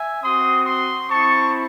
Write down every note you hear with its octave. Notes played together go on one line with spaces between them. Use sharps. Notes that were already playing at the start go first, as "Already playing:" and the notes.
Already playing: E5 G#5
C4 F#4 C6 D#6
C6 D#6
C4 E4 A5 C#6